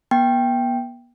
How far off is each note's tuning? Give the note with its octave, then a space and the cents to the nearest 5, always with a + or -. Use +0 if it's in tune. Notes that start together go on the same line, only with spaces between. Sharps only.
B3 -40 G5 +0